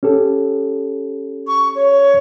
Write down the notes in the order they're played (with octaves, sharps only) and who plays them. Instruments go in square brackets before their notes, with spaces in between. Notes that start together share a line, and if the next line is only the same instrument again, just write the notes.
[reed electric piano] C#4 G4 A4
[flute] C#6
C#5